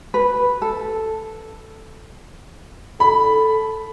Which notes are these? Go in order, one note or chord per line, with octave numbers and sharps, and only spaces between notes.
B4
A4
A4 B5